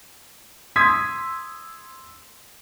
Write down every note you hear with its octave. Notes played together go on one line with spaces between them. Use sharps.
C6 D#6 E6 G#6 B6